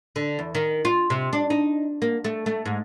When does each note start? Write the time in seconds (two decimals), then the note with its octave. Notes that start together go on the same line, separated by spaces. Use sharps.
0.16 D3
0.39 E2
0.55 D#3
0.85 F4
1.10 C3
1.33 D4
1.50 D#4
2.02 A#3
2.24 A3
2.46 A3
2.66 G#2